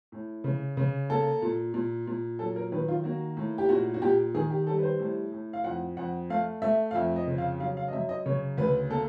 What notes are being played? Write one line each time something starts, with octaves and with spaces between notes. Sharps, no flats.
A2
C#3
C#3
A#3 A4
A#2
A#2
A#2
F#3 A4
A#4
D#3 B4
F4
A#3 F#4
A2
G4
A#2 F#4
F#4
A#2 G4
D#3 G#4
G4
G3 A4
B4
C5
A2
A2
F5
F2 F#5
F2 F#5
A3 F5
A3 E5
F5
F2 E5
D#5
C#3
F5
F#3 F5
F5
D#5
F#2 E5
D#5
C#3 C#5
D2 B4
A#3 A4